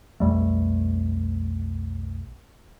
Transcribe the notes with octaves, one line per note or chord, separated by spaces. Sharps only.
B1 F2 G3 A3